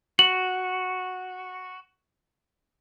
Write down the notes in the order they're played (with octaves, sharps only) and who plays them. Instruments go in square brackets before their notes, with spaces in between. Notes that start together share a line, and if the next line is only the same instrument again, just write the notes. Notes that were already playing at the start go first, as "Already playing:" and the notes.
[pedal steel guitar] F#4 [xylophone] F#7